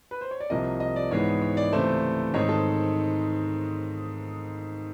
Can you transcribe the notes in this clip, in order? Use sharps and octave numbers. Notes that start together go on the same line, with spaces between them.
B4
C5
C#5
D5
C2 C3 F3 A#3 D#5
D#5
D5
G#2 E3 G#3 B3 C#5
C#5
D5
C#2 C3 E3 A3 C5
G#2 D#3 G#3 C4 D#4 C#5
A4